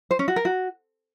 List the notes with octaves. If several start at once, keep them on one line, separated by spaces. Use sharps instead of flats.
C5
C#4
F#4
A#4
F#4